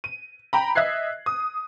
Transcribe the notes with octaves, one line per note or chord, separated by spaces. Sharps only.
D#7
G5 A#5 B5
D#5 E5 F#6 G#6 C7
D#6